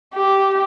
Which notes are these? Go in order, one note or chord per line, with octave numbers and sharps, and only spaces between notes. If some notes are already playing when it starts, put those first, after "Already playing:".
G4